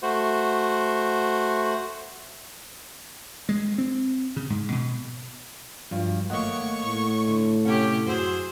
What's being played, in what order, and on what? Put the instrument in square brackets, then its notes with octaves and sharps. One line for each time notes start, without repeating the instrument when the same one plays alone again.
[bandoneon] A3 F#4 C5
[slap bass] G#3
C4
C#3
G#2
B2
[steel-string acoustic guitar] G2 [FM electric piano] F3 F#3 F4
[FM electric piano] G#1 D#5 F#5 [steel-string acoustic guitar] A3 A#3 [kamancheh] C#5 C#6
[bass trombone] A2
[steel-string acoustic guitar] D3
[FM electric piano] C3 A4 [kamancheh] C#4 G4 [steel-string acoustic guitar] F#5
[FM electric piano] F#2 F#4 E6 [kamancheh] G#4 C5